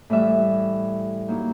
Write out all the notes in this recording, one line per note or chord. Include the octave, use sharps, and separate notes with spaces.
A2 E3 G3 E5
F#3 A#3 D#4